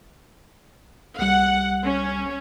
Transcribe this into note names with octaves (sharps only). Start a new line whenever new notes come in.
C2 G3 F#5
C#4